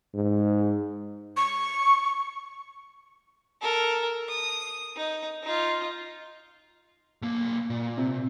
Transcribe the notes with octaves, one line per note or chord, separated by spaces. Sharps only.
G#2
C#6
A4 A#4
D#6
D#4
D#4 F4
B1 A#3
A#2
C3